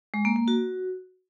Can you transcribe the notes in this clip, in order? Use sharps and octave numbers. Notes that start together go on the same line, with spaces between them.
G#3
A#3
A#3
F#4